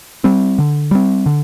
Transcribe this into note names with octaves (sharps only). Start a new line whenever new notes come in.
G3 C4
D3
G3 C4
D3